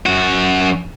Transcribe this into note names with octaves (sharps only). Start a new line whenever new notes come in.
F#2 F#4